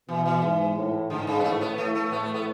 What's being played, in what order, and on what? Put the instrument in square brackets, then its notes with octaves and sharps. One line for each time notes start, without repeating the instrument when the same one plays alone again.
[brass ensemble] B2 [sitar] E3
[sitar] E3
[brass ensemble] G#2
A2
[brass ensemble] G#2 [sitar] D3
[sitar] C#3
B3
[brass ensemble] A2 [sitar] A3
[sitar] B3
[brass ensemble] A2 [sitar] A3
[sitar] A3
[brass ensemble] A2 [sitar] B3
[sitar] A3
B3